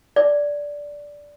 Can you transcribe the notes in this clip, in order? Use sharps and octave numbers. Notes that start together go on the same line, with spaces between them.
D5